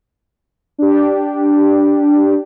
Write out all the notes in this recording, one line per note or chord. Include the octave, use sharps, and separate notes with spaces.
D4 G4